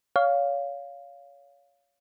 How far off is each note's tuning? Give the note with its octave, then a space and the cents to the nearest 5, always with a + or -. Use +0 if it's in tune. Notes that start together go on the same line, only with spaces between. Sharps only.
C#5 +25 F5 +0